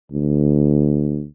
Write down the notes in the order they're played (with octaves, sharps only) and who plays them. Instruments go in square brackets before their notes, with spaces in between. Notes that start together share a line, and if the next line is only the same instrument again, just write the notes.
[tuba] D2